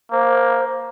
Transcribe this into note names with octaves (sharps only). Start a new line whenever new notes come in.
A#3 C5